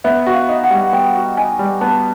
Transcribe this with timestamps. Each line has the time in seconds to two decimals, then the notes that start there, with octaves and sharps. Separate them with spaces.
0.04 B3 E5
0.27 F#4
0.34 F5
0.49 D#4
0.64 F#5
0.70 G3
0.93 B3 G5
1.15 F#4
1.37 D#4 G#5
1.59 G3
1.81 B3 A5